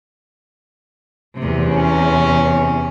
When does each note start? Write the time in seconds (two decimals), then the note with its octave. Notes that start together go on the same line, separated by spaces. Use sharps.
1.37 E2 C3
1.69 C#4